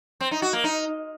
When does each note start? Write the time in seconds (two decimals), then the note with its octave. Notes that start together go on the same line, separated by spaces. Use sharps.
0.21 C4
0.31 D#4
0.42 F#4
0.53 A#3
0.64 D#4